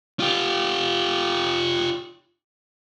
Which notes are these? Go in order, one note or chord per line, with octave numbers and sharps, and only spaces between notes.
F4 G4